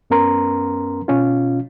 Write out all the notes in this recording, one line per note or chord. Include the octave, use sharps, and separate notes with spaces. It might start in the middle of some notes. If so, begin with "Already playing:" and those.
F#2 B3 C#4 A#4 A#5 C6
B2 C#4 F4